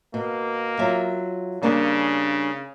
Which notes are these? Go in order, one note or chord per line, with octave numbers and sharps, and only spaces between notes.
B2 A#3
F#3 F4 E5
C#3 G3 A#3 D4